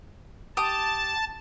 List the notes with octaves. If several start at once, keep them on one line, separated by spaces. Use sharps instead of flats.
G4 A5 D#6